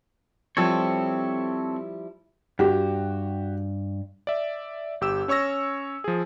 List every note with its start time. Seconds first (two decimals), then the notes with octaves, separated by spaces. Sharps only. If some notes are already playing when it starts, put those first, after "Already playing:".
0.57 F3 G3 C4 E4 A4 C#5
2.59 G2 F#4 G4
4.27 D5 E5
5.01 G1 G4 E6 E7
5.28 C#4 C#5 C#6 E6 A#6
6.04 F3 G#4